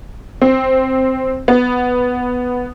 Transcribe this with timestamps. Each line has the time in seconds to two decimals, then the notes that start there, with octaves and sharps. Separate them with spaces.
0.42 C4
1.48 B3